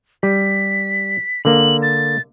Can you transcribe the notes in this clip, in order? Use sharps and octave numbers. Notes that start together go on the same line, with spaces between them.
G3 B6
D3 A#3 F#7
A6